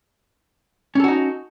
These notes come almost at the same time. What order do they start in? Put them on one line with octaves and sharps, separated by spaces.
C#4 A4 F#4 D#4